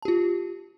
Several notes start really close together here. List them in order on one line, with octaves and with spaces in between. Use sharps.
A5 G4 F4